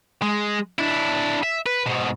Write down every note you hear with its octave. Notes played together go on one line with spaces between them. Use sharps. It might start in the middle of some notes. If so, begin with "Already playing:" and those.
G#3
D4 E4
E5
B4
G#2 B2